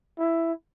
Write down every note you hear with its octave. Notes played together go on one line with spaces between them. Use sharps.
E4